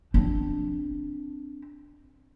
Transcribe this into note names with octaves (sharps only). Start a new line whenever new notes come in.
C4 D4